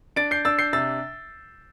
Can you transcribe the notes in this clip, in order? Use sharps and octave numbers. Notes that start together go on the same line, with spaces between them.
D4 A6 D7
G6 C7
D4 E6 A6
G6 C7
C3 E6 A6